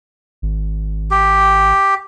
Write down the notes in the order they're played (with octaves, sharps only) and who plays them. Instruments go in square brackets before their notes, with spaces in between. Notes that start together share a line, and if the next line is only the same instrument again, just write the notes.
[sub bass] G#1
[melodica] G4